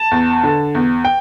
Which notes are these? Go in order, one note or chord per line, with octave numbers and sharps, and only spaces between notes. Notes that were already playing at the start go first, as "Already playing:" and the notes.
Already playing: A5
E2
D3
E2
G5